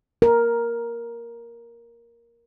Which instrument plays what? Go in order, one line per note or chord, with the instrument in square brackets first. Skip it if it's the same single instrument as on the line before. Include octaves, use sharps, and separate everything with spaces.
[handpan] A#4